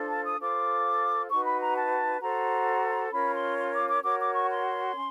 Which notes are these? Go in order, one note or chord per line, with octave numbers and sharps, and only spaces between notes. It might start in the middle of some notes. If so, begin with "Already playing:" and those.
Already playing: D4 F4 A4 C5
A5
D#6
F4 A4 C5 D6
D#4 F#4 B4 C#6
B5
A#5
A5
F#4 A4 C5 A#5
C#4 F4 A#4 C#5 B5
C6
C6
D6
D6
F#4 A#4 C#5 D6
D6
C#6
C6
C#4